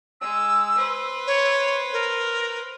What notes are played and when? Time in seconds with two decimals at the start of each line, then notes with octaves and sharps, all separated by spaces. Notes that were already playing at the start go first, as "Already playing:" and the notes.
0.21 G#3 E6
0.77 B4 C5
1.27 C#5
1.93 A#4